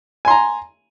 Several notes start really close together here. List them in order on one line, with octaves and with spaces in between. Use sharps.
G#5 C6 A#5